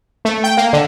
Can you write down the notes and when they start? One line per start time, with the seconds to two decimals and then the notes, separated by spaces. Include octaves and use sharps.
0.25 A3
0.44 G5
0.58 A#3
0.73 D3